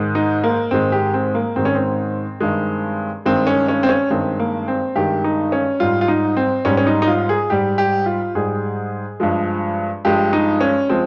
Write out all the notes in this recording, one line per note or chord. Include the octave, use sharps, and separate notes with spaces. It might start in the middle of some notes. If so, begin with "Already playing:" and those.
Already playing: G#2 D#3 G#3
D#4
A#3
G#2 D#3 G#3 C4
G4
C4
A#3
G#2 D#3 G#3 C4
C#4
C4
G2 D#3 G#3
G2 D#3 G#3 C4
C#4
C#4
C4
C#4
G2 D#3 G#3 C4
A#3
C4
G2 D#3 G#3 G4
D#4
C#4
G#2 G3 F4
F4
D#4
C4
G#2 G3 C#4
C#4
D#4
D#4
F4
G#4
G#2 G3 G4
G4
F4
G#2 G3 G#4
G2 F3 G#3
G2 F3 G#3 G4
D#4
C#4
F3 G#3 C4